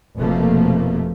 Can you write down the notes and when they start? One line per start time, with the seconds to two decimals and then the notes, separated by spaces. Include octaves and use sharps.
0.17 F1 B2 F3 A3 A#3